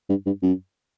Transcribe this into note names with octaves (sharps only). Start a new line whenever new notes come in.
G2
G2
F#2